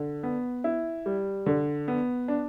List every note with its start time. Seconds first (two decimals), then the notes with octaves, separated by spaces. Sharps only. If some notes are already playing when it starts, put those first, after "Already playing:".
Already playing: D3
0.23 B3
0.64 E4
1.06 G3
1.46 D3
1.88 B3
2.28 D4